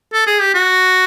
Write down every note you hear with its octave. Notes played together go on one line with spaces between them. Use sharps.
A4
G#4
G4
F#4